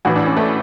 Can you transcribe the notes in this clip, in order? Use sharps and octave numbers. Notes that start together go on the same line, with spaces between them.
A1 A2 E3 F#4
D4
C#4
A3